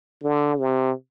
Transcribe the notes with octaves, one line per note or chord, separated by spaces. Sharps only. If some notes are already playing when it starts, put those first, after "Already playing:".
D3
C3